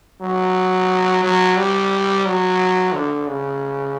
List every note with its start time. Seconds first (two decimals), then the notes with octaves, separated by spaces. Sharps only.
0.21 F#3
1.23 F#3
1.57 G3
2.26 F#3
2.93 D3
3.27 C#3